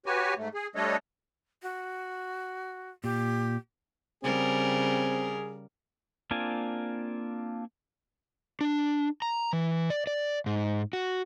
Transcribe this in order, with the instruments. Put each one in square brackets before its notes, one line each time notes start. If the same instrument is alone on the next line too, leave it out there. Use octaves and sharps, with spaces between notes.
[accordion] F#4 G4 B4 C#5 G#5
G#2 A3
G#4
G3 A3 D4 A4 C#5 D#5
[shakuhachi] F#4
[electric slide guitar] A#2 [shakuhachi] G4
[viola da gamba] C#3 G3 A#4 [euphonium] C4 [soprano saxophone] G#4
[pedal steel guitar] A#3 C4 D4 F4 G#5
[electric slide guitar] D4
A#5
E3
D5
D5
G#2
F#4